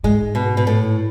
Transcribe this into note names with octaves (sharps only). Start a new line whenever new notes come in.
G#2 G#3
B2
B2
A2